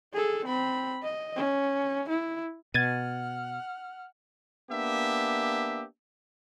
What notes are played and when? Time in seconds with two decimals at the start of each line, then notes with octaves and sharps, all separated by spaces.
0.13 G#4 A4
0.45 C4 B5
1.03 D#5
1.36 C#4
2.09 E4
2.74 B2 F#5 F6 G#6 A6 D#7
4.71 A#3 B3 D4 G4 E5